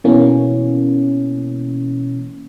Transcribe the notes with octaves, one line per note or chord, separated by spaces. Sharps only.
B2 E3 A#3 C#4